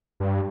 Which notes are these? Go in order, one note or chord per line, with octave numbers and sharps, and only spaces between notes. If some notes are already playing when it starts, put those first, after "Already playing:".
G2